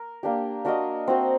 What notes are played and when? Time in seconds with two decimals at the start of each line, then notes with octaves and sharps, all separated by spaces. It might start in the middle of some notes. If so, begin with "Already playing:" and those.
Already playing: A#4
0.23 A#3 D4 G4
0.65 D4 F#4 A#4 D#5
1.08 C4 F#4 C5